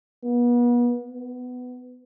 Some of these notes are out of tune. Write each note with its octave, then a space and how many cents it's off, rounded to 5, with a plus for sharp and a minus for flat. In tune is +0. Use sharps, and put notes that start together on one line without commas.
B3 -35
B3 +15